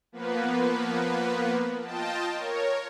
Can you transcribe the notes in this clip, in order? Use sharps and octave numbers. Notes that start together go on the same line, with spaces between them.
F3 A#3 B3 B4
F4 D#5 G5 A5
A#4 C#5